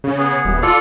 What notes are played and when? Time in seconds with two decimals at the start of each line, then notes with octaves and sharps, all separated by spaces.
0.04 C#3
0.18 B3 G#4
0.45 D#1
0.62 F4 A4 D5